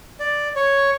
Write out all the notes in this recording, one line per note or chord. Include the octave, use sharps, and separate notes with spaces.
D5
C#5